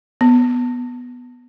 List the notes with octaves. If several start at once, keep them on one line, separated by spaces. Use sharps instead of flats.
B3